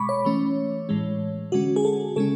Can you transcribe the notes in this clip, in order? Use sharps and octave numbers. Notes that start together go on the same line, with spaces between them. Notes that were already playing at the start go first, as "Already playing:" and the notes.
Already playing: B2 G#3 B5 C#6 D6
C#5
E3 A3 C#4
A2 E3 G#3
D3 G#3 C#4 F#4
G#4
A4
C#3 G#3 C#4 A4